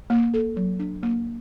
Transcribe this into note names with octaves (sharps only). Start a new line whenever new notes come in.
A#3
A4
F#3
D4
A#3